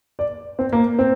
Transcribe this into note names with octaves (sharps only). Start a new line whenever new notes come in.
D5
C4
A#3
C4